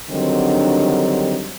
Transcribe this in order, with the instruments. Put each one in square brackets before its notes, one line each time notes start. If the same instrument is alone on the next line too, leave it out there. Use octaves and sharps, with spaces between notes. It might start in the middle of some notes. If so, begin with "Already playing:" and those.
[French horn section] D3 D#3 F#3 G3 C4 D4